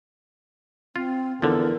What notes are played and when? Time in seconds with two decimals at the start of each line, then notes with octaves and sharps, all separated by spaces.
0.96 C4 F4
1.42 E2 D3 F3 A4 A#4